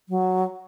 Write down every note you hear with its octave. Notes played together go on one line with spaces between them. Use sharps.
F#3